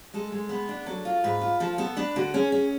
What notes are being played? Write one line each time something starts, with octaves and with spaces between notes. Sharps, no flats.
G#3 A4
G#3
B3 B4
D4
F#3 A4
F4
G#2 B4
F4
F3 A4
B3 A4
D4 B4
D3 F#4
C#4 G#4
C#4